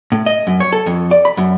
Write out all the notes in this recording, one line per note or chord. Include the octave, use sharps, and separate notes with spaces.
A2
D#5
F#2
C#5
A4
F2
D5
B5
F#2